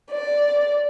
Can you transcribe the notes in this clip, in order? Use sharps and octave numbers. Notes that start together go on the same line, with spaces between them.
D5